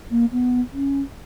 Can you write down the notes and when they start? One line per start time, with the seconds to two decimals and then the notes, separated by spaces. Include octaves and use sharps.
0.11 A#3
0.32 B3
0.73 C#4